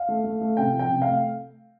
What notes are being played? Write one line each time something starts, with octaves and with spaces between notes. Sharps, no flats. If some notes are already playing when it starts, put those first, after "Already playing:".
Already playing: F5
A3
A3
A3
C3 G5
F3
G5
C3
A3 F5